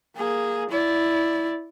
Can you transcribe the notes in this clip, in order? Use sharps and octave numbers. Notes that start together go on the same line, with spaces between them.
A#3 G#4
E4 D5